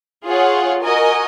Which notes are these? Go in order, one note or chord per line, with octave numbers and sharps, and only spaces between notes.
F4 G#4 C#5 F#5
F#4 A#4 D#5 G#5